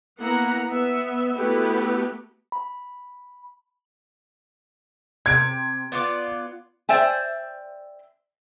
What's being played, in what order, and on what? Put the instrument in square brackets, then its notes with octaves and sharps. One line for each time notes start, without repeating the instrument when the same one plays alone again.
[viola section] A#3 B3 E4 F#5 A#5
B3 E5
A3 B3 E4 F#4 G4 B4
[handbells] B5
[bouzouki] C3 [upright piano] G#6 D7
[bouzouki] B3 F4 D5
[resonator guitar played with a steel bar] C5 D5 E5 G5 G#5